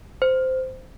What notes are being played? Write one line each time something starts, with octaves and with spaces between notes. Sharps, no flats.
C5